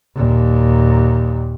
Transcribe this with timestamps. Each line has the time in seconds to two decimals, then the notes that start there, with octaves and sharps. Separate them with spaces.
0.15 D#2 A#2